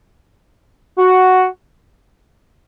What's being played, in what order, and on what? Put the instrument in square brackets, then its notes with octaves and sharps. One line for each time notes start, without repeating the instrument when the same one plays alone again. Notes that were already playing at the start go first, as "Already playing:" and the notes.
[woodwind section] F#4